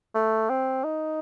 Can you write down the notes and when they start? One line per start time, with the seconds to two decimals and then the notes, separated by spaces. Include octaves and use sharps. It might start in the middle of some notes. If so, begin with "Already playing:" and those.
0.14 A3
0.50 C4
0.84 D#4